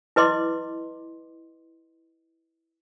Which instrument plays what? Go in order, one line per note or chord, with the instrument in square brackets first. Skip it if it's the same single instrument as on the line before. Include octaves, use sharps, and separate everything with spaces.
[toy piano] E4 B4 D#5 C6 D6